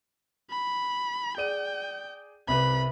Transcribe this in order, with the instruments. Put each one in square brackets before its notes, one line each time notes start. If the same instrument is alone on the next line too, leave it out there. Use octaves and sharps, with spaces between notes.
[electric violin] B5
[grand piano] G#4 D5 D#7 [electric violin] G5
[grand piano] C2 C3 B4 [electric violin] B5